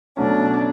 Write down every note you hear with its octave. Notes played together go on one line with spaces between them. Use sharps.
B2 F#3 A3 C#4 D4